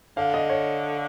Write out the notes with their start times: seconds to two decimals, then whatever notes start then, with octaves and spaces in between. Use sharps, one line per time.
0.17 D3 F5
0.34 D#5
0.50 C#5